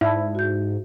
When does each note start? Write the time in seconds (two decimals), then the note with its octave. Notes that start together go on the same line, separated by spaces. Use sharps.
0.01 G#2 E4 D5 A5
0.35 F#4 G6